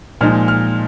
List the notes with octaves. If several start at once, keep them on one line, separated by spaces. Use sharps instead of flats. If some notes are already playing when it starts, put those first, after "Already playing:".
A#2 F3 G#3 D#4 F6
F6